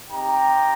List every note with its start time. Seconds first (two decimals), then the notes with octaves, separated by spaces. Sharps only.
0.11 C4 D#4 G4 G5 A#5